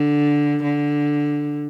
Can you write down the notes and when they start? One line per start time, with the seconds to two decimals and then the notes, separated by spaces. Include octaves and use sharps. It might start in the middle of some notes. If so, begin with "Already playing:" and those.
Already playing: D3
0.63 D3